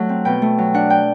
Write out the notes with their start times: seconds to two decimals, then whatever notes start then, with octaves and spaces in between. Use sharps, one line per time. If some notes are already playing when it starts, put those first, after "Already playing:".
Already playing: F#3 A3 F#5
0.09 C4
0.25 B2 G5
0.42 A3
0.58 F#3
0.74 D4 F#5
0.90 G5